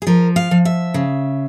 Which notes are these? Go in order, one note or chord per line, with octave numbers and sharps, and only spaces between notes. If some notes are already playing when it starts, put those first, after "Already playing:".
G#4
F3 A#4
F5
F3
E5
C#3